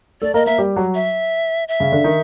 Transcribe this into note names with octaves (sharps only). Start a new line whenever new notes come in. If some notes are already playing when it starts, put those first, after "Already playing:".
A3 A4 D5
A#3 A#4 D#5
A#3 A#4 E5
G3 G4
F#3 F#4
E5
E5
C#3 C#4
D3 D4
D#3 D#4